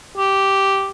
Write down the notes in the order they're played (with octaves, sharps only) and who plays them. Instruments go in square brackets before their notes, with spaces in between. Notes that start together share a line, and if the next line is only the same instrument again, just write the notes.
[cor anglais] G4